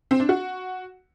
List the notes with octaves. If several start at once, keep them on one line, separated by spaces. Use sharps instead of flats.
C4
D4
F#4